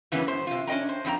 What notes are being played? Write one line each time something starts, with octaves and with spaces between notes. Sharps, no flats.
F#2 C#3 E3 A#3 B3 C#4
F#2 C5
C3 F4
C#4 D4 D#5 G5 A#5
C5
F2 C4 E4 G5 A#5